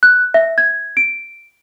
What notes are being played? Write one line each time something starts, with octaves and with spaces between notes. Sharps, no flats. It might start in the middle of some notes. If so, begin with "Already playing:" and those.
F#6
E5
G#6
D7